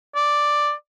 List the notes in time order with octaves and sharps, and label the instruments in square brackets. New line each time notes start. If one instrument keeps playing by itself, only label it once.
[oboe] D5